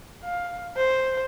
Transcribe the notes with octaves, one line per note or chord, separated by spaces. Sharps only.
F5
C5